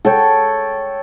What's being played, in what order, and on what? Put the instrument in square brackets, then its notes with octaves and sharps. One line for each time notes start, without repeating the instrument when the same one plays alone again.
[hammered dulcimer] A4 C#5 G5